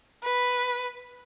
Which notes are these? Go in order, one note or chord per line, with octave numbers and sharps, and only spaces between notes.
B4